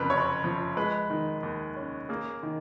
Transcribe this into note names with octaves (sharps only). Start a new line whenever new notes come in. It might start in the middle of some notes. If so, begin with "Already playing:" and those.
Already playing: F2 C#3 A#4 B4
F#1 C#5
F3
G#3 B4
D#3
D#2
C#4
A#3 G#4
D#3